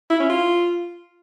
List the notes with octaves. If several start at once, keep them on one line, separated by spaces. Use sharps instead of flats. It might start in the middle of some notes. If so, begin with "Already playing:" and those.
E4
C#4
F4